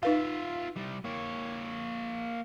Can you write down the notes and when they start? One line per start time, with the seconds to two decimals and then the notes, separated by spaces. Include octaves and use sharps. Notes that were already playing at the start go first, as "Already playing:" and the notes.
0.03 D#4 F4 B4 E5 F5
0.76 C3 G3
1.05 A#3 C#5